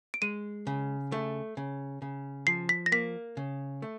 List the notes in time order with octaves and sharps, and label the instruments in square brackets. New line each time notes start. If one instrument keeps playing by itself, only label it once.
[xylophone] D7
[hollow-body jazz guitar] G#3 [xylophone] D#7
[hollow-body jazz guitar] C#3
A3
C#3
C#3
[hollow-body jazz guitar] F3 [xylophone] C7
[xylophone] B6
A#6
[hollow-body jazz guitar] A#3 [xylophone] B6
[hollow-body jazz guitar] C#3
A3